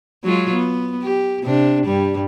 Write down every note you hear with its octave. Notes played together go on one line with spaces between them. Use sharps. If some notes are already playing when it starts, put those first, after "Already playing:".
F#3 G#3 F4
B3
G4
C3 D4
G2 G3